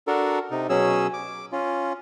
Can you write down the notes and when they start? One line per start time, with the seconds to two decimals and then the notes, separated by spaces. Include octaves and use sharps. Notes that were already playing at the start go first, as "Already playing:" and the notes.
0.07 D4 F#4 A4 A#4
0.51 C3 D#4
0.69 B2 F#3 C#4 G#4 E6
1.14 D6
1.52 C#4 F4